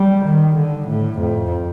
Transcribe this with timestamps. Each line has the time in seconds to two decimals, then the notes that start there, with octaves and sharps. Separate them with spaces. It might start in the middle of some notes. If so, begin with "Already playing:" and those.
Already playing: G3
0.25 D#3
0.57 D3
0.88 A2
1.19 F2